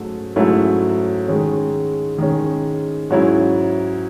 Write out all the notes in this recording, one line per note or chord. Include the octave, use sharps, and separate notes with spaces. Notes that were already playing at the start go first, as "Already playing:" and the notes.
Already playing: G#2 F#3 A3 C#4
G#2 F#3 A3 C#4 E4
D#3 G#3 C#4
D#3 G#3 C#4
G#2 F#3 C#4 E4